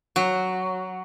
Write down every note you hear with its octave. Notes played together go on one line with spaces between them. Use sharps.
F#3